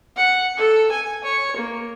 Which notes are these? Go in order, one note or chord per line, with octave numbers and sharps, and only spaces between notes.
F#5
A4
G#5
C#5
A#3